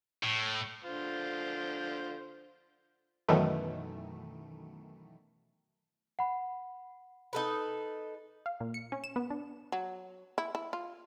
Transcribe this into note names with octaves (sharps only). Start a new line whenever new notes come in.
A2
D3 F4 C5
F#2 B2 D#3 E3 A3
F#5 B5
D#4 A4 B4
F5
A#2
C#7
C#4
E7
B3
D4
F#3
E4
E4
F4